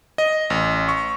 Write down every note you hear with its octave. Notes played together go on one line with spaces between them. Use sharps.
D#5
A1
C#6